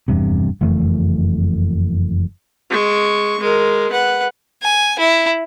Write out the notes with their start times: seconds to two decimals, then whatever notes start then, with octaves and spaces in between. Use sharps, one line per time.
0.08 F1 E2 G2 C3
0.61 F#1 F2 E3 A3
2.71 G#3 C#6
3.40 G#3 A#4
3.91 B4 F#5
4.62 G#5
4.99 E4